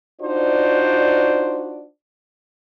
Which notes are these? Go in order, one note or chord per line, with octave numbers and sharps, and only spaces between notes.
D4 D#4 F4 F#4 C5 D5